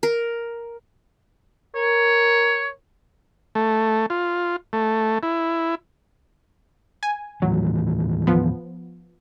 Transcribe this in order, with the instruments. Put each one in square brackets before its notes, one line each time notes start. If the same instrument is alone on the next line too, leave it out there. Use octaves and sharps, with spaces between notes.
[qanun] A#4
[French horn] A#4 [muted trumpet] C#5
[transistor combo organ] A3
F4
A3
E4
[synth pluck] G#5
[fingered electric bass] D#2 A2 E3 [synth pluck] F#3
[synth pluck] F3 B3